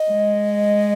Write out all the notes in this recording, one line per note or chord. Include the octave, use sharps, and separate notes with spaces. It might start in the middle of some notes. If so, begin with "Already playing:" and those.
Already playing: D#5
G#3